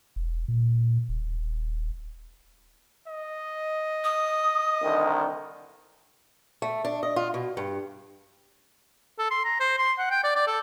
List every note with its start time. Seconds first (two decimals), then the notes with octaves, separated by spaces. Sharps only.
0.16 E1
0.48 A#2
1.09 D#1
3.08 D#5
4.04 D#6
4.82 C2 D3 D#3
6.62 A3
6.85 D4
7.03 D#5
7.16 F4
7.34 B2
7.57 G2
9.19 A4
9.31 C6
9.45 A#5
9.60 C5
9.79 C6
9.98 F#5
10.11 G5
10.24 D5
10.35 D5
10.47 A4